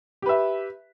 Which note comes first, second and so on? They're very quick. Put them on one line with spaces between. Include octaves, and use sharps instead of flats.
G4 B4 E5